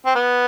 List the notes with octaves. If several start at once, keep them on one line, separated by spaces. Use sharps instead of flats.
C4
B3